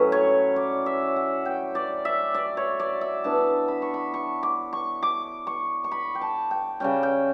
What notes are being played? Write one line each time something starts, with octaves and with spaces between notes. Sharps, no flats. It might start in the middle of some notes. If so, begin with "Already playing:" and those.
Already playing: A2 F#3 C#4 B4
C#5
D5
E5
F#5
G5
D5
E5
D5
C#5
D5
E5
E3 B3 D4 A5
B5
C#6
B5
C#6
D6
C#6
D6
C#6
C#6
B5
G5
A5
G5
C#3 G3 C#4 G5
G5